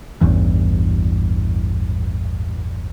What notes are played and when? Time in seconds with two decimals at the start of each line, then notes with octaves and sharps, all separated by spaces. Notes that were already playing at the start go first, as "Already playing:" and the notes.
0.21 A1 E2 G2 E3